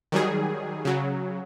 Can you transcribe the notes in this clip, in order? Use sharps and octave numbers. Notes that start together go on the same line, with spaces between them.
D#3 F#3 G3 G#4
C#3 F#3